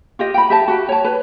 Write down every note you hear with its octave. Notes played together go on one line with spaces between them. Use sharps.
F4 G4 D#5
G5 B5
G4 E5 A5
F#4 G4 G5
C#5 A5
B4